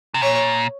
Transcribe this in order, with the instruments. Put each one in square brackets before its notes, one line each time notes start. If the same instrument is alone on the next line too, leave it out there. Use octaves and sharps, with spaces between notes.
[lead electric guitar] C3
[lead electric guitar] A#2 [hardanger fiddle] C#5